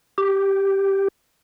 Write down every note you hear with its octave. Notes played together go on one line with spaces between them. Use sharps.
G4